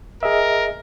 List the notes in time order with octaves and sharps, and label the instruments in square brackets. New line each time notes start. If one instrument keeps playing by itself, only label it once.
[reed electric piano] G#4 D#5 E5 [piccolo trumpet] A#4